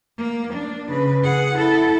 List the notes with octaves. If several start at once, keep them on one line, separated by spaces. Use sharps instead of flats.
A#3
D4
C#3 B4
G#4 F#5
E4 A4